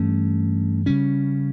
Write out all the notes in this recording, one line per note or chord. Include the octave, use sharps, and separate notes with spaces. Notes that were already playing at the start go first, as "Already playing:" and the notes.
Already playing: G2 E3 A3 C#4
C#3 G3 C#4